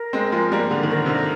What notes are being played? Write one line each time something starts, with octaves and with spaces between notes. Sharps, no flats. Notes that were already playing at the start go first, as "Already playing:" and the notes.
Already playing: A#4
G#3 C4
F3 G#3
G3 A#3
D3
D#3
D3 A#4
C3
D3